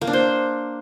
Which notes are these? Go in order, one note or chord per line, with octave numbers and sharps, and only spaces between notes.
A#3
D4
C5